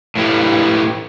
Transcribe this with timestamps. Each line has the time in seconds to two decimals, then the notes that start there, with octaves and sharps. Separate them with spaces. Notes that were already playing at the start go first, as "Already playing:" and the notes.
0.15 A2 E3 G3